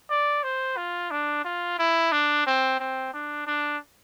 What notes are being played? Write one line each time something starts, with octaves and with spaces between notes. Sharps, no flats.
D5
C5
F4
D4
F4
E4
D4
C4
C4
D4
D4